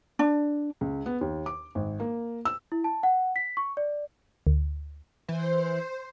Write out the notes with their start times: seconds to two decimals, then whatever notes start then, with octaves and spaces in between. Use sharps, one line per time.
0.19 D4
0.81 C#2
1.06 B3
1.21 D#2
1.46 D6
1.75 G#1
2.00 A#3
2.45 E6
2.72 E4
2.84 A5
3.03 F#5
3.36 B6
3.57 C#6
3.77 D5
4.47 D2
5.29 E3 C5